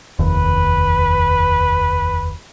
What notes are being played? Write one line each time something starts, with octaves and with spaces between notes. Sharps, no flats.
F1 D#2 B4